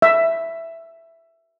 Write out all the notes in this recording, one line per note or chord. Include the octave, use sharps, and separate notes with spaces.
E5